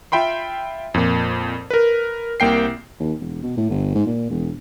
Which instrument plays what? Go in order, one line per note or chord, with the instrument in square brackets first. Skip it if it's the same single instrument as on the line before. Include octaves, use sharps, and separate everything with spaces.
[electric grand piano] F4 E5 G5 B5 C6
F2 A#2
A#4 B4
C2 A#3 G5 C7
[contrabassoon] D#2
E1
B2
A2
G1
G#2
A#2
E1